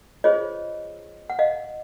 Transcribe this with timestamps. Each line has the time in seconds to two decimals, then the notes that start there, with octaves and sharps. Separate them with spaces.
0.24 F4 G#4 C5 C#5 D#5
1.30 F#5
1.39 D#5 F5